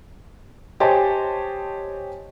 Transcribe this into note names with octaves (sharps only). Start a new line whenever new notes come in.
G4 C5 C#5 D#5 G#5 A5